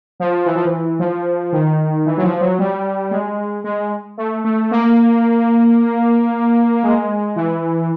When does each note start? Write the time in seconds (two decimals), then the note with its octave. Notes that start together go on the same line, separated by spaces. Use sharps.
0.20 F3
0.46 E3
0.55 F3
0.65 E3
0.99 F3
1.52 D#3
2.06 E3
2.17 F#3
2.23 F3
2.41 F#3
2.59 G3
3.11 G#3
3.64 G#3
4.17 A3
4.44 A3
4.71 A#3
6.83 G#3
7.36 E3